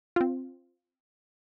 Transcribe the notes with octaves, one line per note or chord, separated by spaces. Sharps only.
C4 F4